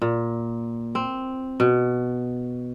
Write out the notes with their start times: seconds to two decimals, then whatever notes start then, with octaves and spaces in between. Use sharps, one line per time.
0.02 A#2
0.95 C4
1.60 B2